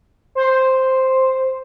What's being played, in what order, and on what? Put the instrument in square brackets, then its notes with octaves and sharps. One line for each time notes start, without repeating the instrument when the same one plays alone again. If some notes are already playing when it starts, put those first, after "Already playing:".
[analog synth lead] C5